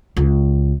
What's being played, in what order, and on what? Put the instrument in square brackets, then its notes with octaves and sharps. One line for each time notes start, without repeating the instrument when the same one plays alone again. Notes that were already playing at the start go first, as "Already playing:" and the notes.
[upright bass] C#2